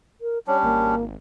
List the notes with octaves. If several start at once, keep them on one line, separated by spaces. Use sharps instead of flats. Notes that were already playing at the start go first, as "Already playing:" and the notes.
A#4
G3 C#4 D4 C#5
G#1 A#3